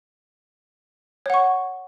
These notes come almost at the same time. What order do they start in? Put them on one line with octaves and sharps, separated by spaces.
C#5 F#5 C#6